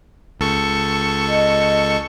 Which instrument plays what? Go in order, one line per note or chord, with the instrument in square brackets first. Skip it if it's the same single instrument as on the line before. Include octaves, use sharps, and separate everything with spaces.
[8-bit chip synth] C#2 A4 C#6
[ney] D#5